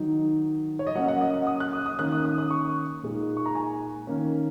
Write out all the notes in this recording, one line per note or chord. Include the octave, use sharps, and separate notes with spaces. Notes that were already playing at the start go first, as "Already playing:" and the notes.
Already playing: D#3 F#3 D#4
C#5
D#5
F#3 A#3 C#4 F#5
F#5
D#5
F#5
D#6
F#6
D#6
D#6
D#3 A#3 C#4 F#6
D#6
D#6
D#6
C#6
A#2 G#3 D#4
C#6
A#5
G#5
D#3 A#3 C#4